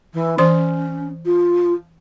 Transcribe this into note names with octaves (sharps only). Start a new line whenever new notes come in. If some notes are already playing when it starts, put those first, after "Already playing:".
E3
E3 C#4 C5 C6
F4